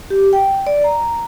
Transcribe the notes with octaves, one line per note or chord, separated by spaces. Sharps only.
G4
G5
D5
A#5